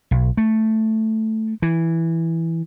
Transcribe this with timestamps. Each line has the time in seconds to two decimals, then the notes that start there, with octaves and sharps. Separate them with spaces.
0.11 B1
0.37 A3
1.62 E3